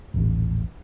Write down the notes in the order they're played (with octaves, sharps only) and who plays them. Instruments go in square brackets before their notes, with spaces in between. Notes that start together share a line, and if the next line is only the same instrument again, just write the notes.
[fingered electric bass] D#1 A1